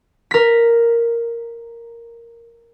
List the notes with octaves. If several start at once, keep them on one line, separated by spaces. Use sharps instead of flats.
A#4 B6